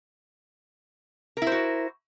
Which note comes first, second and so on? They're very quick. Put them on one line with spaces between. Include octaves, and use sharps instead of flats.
A#4 E4 C5 F#4